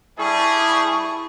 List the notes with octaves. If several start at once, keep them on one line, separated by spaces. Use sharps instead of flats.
G3 E4 G#4 A5 C#6